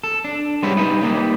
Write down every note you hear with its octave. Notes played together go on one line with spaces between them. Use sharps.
A4
D4
G3 G#3 B3 C#4 E4 G4
G3 D#4 B4
G3 A#3 D#4